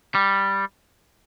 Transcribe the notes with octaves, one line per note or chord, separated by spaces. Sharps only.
G3